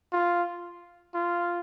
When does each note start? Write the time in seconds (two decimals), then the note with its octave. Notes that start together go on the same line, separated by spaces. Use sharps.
0.13 F4
1.15 F4